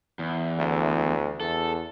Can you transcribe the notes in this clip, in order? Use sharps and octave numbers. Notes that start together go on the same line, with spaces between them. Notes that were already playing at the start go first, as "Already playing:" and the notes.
E2
D2
E2 A4